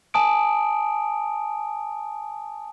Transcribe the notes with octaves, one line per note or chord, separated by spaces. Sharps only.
G#5 A5 D#6 D7